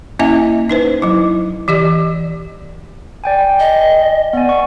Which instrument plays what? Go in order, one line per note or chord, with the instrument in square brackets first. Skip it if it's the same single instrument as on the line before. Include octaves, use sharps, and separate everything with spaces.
[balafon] A#3 C#4 E4 D#5 E5 G#5
D#4 B4 C5
F#3 E4
E3 G4 D5 D#5
[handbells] D5 G5 G#5
[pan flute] D#5
[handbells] B3 G#5 [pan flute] D5
[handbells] C#6